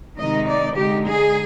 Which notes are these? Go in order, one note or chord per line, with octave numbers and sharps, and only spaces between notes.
C3 D#3 G#3 D#4 D#5
D5
D3 G#3 D#4 G4
G#4